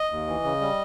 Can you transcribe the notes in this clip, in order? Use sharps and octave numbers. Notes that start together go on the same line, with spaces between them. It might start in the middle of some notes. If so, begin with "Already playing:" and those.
Already playing: D#5
D#2
E3
C#3
G3